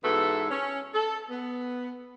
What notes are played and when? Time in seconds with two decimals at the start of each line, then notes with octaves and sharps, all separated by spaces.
0.03 E2 G#2 B3 F#4 A4 E5
0.50 C#4
0.94 A4
1.30 B3